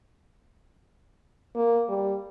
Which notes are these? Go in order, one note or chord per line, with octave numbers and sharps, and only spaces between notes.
A#3
G3